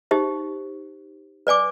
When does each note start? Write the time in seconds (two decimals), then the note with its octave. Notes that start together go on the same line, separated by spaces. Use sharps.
0.11 D#4 G4 C5
1.47 B4 D5 G#5 D6